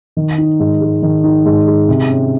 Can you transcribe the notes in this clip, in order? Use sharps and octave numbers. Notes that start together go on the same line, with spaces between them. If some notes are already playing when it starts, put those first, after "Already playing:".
D#3
D#4
G#2
G#3
D#3
D#4
G#2
G#3
C3
C#4